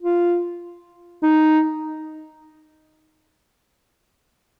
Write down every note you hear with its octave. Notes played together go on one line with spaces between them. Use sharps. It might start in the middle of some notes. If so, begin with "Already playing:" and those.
F4
D#4